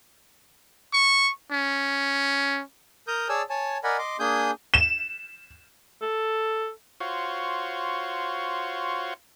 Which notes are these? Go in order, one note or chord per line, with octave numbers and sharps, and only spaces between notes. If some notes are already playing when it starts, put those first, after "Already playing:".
C#6
C#4
A#4 A#5 D#6 G6
G#4 C#5 D5 G#5 A5 E6
C#5 G#5 A5
A#4 D5 D#5 F#5 G#5 B5
D#5 C6 D6
A#3 D4 G#4 G#5 D#6 G6
E7
A4
F4 F#4 C5 C#5